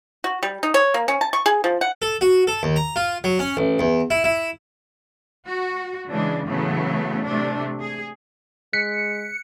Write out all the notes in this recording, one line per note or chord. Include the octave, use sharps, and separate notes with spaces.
F#4
G3
D#4
C#5
A#3
C#4
A5
C#6
G#4
F3
F#5
A4
F#4
A4
D#2
A#5
F4
F#3
C#4
A1
E2
E4
E4
F#4
C#3 E3 G#3 D4
A2 C#3 E3 F#3 A3 B3
C3 A3 D4
G#4
G#3 F#6 B6 C#7